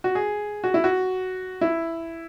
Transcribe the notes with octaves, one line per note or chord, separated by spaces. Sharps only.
F#4
G#4
F#4
E4
F#4
E4